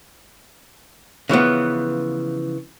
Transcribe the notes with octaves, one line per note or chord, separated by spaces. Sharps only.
C#3 E3 F3 B3